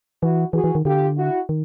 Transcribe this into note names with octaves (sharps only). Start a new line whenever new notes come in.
E3 E4 F#4
E3 F#4 G#4
E3
D#3
D3 F4 G4
E4 F#4
D#3